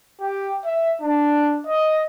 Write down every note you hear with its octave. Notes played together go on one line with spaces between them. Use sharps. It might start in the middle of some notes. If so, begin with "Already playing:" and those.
G4
E5
D4
D#5